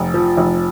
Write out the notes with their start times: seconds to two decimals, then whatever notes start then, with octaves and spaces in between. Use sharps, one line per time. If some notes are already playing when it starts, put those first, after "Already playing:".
Already playing: F1
0.14 F3
0.37 F1